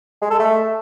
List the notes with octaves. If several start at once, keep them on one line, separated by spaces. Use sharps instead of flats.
G#3
A4
A3